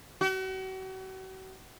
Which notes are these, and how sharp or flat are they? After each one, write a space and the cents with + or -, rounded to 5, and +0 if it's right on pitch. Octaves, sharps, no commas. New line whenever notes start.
F#4 +40